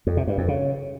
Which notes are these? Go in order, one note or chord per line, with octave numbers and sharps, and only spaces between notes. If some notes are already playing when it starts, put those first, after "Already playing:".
F2
C3
G2
F2
C#3